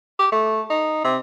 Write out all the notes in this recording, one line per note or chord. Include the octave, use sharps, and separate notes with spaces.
G4
A3
D#4
C3